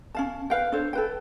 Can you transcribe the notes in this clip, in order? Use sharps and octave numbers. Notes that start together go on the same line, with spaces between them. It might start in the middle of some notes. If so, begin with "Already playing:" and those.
C#4 F5 A5
B4 F5 G5
D4 A4 C5 C#5
A4 B4 G5